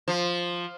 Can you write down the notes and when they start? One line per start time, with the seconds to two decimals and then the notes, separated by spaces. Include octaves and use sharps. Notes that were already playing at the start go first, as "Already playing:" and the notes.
0.08 F3